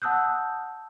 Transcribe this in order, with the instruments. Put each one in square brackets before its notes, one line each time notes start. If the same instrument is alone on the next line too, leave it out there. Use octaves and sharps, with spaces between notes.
[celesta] F#5 A5 D#6 E6 F#6 G6